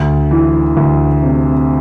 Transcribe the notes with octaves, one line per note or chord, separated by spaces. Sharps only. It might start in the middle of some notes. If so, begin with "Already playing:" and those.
Already playing: D2
E3
D2
C3